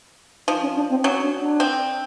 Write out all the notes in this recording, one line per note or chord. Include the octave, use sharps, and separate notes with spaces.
F3 D#4
C#4
D4
C4
F#3 C#4
D4
D4
C4